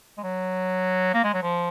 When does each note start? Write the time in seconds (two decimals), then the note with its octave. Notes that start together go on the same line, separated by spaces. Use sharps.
0.18 G#3
0.24 F#3
1.14 A#3
1.24 G#3
1.34 F#3
1.43 F3